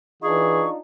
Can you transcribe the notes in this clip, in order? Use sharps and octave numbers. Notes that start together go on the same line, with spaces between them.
E3 D4 D#4 F4 G#4 C#6